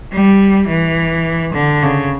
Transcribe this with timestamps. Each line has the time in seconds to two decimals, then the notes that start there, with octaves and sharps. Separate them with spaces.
0.13 G3
0.69 E3
1.54 D3
1.83 C#3